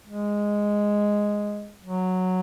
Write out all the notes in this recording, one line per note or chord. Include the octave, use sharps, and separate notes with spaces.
G#3
F#3